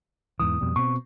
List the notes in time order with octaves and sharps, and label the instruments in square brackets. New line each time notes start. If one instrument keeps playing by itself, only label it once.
[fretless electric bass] E2 G#2 E3 [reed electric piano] D#6
[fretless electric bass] F2 B2 G3
[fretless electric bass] B2 C4 [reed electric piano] C#6